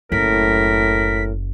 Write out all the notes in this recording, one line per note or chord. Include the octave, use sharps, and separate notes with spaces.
F#1 A2 A#4 B6